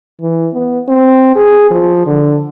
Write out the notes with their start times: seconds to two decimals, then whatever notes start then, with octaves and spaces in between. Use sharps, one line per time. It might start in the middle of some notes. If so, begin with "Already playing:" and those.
0.21 E3
0.53 B3
0.89 C4
1.36 G#4
1.71 F3
2.07 D3